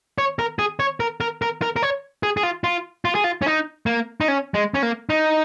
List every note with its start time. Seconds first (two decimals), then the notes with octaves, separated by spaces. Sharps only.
0.18 C#5
0.39 A#4
0.59 G#4
0.80 C#5
1.00 A#4
1.20 A#4
1.42 A#4
1.62 A#4
1.76 A#4
1.82 C#5
2.23 G#4
2.37 G#4
2.43 F4
2.64 F4
3.05 F4
3.15 G#4
3.24 F4
3.42 C#4
3.46 D#4
3.86 A#3
4.21 D#4
4.28 C#4
4.54 G#3
4.74 C#4
4.83 A#3
5.10 D#4